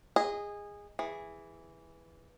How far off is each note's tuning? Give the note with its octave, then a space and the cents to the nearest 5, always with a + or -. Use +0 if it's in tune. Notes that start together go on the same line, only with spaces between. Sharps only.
G#4 -20 D#5 +0
E3 +0 G#4 -15